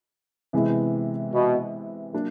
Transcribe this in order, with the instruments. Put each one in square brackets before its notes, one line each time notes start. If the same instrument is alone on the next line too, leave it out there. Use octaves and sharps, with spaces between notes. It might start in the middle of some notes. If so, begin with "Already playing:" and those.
[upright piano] C3 E3 G#3 B3 E4
[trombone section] B2
[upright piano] F#3 A#3 D4